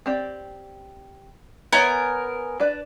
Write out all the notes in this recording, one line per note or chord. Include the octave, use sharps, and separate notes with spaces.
C4 G4 D5
B3 A#4 C#5 E5 G#5 B5
D4 B4 D5